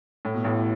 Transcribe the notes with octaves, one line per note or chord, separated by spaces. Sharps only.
A2
B2
A1 A2